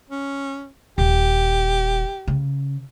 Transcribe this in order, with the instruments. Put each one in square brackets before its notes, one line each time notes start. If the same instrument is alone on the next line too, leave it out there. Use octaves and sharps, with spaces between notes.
[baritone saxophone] C#4
[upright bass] D#1 [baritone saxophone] G4
[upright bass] C#3